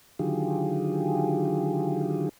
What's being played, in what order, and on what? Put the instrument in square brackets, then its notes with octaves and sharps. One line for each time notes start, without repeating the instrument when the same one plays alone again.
[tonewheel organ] D3 D#3 F#3 F4 G4 G#4